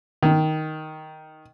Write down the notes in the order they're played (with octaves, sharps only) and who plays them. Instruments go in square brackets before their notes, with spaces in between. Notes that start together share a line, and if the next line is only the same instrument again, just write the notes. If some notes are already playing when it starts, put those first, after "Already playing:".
[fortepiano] D#3